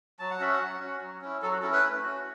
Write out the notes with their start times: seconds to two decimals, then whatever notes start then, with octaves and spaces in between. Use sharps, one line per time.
0.19 F#3 A5
0.31 F#5
0.40 C#4 F#4 E5
0.53 F#5
0.60 F#3
0.80 C#4 F#4
1.02 F#3
1.21 C#4 E4
1.42 F#3 A4
1.53 F#4
1.62 C#4 E4 A4
1.73 B4
1.83 A3
2.03 C#4 F#4